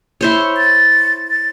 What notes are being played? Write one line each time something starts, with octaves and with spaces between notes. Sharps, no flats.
E4 C5 C#5
A6
A6